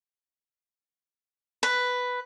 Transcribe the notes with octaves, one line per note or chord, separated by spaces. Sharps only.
B4